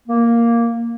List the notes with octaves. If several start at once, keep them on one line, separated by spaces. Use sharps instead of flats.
A#3